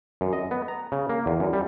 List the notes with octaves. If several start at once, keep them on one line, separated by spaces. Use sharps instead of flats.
F#2
D#5
B3
A#5
C#3
A#3
E2
F#2
G3